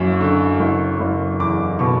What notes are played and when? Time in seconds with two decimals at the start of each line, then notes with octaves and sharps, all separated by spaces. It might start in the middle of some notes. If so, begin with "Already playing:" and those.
Already playing: F#1 F#2 A#3
0.21 D3
0.60 F#1
1.00 F#1
1.40 E2 D6
1.79 B2 C#6